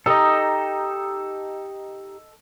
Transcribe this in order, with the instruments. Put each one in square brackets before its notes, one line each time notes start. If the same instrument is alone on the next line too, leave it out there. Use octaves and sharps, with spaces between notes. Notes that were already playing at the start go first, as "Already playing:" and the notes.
[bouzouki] D#4 G4 [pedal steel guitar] A4 D#5